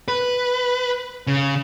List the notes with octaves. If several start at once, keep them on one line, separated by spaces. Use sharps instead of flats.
B4
C#3